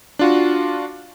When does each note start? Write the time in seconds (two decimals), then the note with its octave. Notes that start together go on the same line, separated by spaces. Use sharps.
0.19 D4 F4 F#4